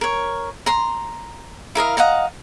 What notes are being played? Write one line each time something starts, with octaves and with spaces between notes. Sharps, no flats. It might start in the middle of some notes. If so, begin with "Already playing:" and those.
A#4 C#5
A#5 C6
E4 A#4 D#5 F5
D#5 F5 F#5 A#5